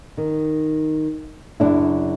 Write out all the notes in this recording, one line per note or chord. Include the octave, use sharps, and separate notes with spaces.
D#3
F#2 C#3 D4 E4